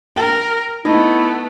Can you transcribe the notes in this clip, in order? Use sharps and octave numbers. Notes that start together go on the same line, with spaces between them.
A#4 G5
A3 B3 D#4 E4